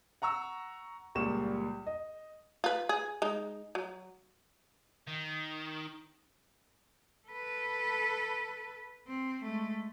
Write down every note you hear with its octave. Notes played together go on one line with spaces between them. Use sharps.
F#5 A#5 C#6 E6
C#2 A#2 G3 C#6 E7
D#5
F4 B4
G#4
G#3 D#4
F#3
D#3
A4 B4
C4
G#3 A3